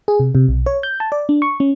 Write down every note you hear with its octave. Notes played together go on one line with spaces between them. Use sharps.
G#4
C3
C3
B1
C#5
G6
A5
D5
D4
C#6
C#4